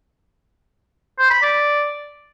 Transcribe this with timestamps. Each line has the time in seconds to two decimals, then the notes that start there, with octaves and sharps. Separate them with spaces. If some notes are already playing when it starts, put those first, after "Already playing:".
1.19 C5
1.31 B5
1.42 D5